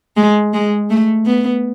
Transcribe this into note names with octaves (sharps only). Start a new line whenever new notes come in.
G#3
G#3
A3
B3